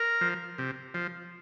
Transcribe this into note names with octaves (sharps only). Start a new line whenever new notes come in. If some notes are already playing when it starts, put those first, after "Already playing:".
Already playing: A#4
F3
C3
F3